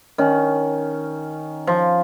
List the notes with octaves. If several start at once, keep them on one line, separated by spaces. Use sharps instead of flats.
D#3 C#4
F3